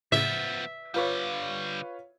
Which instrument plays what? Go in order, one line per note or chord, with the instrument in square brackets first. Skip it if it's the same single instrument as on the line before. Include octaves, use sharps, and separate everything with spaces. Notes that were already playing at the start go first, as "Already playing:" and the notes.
[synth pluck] A2 C#3 G#6 [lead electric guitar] F3 B3 [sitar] E5
[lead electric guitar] D3 G3 [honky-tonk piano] F4 B4 C#5